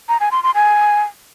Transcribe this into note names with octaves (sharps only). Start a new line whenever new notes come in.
A#5
G#5
C6
C6
G#5